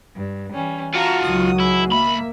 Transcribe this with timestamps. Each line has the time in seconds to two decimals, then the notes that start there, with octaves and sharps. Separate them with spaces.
0.16 G2
0.52 E3 G3 C#4
0.95 F4 F#4 F5 F#5 A5 A#5
1.23 C#2 D#3 F#3 D#6
1.60 E4 G#4
1.92 B1 A#3 E5 B5